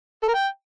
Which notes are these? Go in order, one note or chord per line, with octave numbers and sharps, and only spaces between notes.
A4
A#4
G5